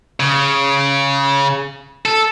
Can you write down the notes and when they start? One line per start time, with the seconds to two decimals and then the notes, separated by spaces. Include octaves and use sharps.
0.20 C#3
2.05 A4